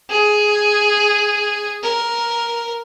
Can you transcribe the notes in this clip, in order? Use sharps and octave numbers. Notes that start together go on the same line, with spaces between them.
G#4
A#4